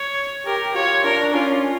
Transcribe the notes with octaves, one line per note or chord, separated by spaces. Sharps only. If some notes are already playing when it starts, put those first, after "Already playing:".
Already playing: C#5
G4 A#4
F4 C#5
D4 A#4
C#4 F4